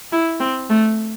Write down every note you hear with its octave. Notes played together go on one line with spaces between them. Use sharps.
E4
C4
A3